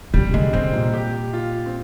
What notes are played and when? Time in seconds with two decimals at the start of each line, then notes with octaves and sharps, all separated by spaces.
0.14 C3 G3
0.34 D3 G#3
0.53 D3 C4
0.73 A#2
0.94 G4
1.33 F4
1.66 C4